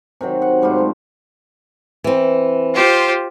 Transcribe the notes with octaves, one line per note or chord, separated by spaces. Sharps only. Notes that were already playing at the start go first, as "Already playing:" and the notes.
C3 D#3 F#3 C4
F#5
G#2 G3 A3 F4
F#3
E3 C4
F4 G4 C5